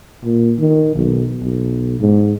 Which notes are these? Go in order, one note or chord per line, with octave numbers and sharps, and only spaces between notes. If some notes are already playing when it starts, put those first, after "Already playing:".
A#2
D#3
B1
B1
G#2